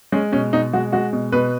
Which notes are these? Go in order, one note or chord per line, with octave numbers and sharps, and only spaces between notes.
G#3 C#4
B2 C#4
B2 D#4
G#3 F#4
G#3 F#4
B2
B2 B4